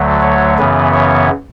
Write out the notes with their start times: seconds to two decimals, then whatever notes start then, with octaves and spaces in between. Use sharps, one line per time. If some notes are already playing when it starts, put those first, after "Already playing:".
Already playing: D2 D3 F#3 A3
0.22 C#5
0.58 F#2 C#3 E3 B3 B4
0.94 C#5